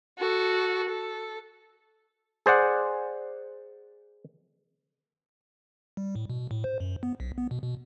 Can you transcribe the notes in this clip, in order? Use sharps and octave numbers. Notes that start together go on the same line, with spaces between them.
F#4 A4
A4
G#4 C5 D5 F#5
G3
A2
B2
A2
C5
F#2
B3
B1
B3
B2
B2